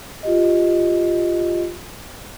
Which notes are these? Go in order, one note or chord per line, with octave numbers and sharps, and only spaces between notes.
F4 G4 D#5